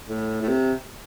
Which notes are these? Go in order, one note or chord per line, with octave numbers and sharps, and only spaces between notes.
A2
A2
C3